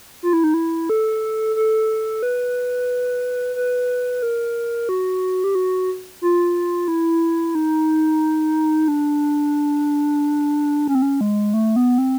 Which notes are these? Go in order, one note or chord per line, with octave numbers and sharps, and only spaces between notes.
F4
E4
D#4
E4
A4
A4
B4
B4
A#4
F#4
G4
F#4
F4
E4
D#4
D4
C#4
C4
C#4
G#3
A3
B3
C4